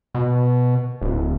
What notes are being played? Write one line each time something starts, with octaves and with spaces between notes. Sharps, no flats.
B2
D1